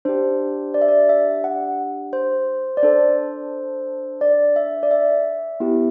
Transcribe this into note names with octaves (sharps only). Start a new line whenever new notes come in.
D4 G4 C5
D5
E5
D5
E5
F#5
C5
D5
D4 A4 C5
D5
E5
D5
E5
B3 E4 G4